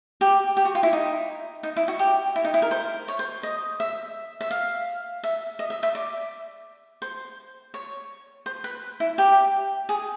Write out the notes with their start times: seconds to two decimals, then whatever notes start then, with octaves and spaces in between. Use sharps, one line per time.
0.21 G4
0.57 G4
0.65 F#4
0.75 F4
0.83 E4
0.93 D#4
1.63 D#4
1.76 E4
1.88 F#4
1.99 G4
2.36 E4
2.44 D#4
2.54 E4
2.62 A#4
2.71 C5
3.08 C#5
3.19 C5
3.43 D#5
3.80 E5
4.41 E5
4.51 F5
5.23 E5
5.59 D#5
5.70 E5
5.83 E5
5.95 D5
7.02 C5
7.74 C#5
8.46 C5
8.64 B4
9.00 E4
9.18 G4
9.89 G#4